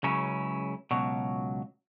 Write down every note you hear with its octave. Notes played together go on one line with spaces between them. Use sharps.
C#2 C#3 F#3 C#4 E4
C#2 B2 F#3